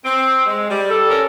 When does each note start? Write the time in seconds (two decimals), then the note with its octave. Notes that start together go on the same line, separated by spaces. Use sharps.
0.05 C4
0.45 G#3
0.70 G3
0.90 A4
1.10 C#4 A#4